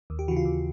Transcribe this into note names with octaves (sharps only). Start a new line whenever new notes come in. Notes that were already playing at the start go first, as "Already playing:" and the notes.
D#2
G4
C#3 E3 F#4
F4
D#2